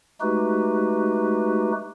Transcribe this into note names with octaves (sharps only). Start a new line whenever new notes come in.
G#3 A3 D#4 F#4 G4 B4